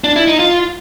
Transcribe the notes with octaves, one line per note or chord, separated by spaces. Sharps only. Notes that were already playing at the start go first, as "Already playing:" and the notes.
D4
E4
D#4
F4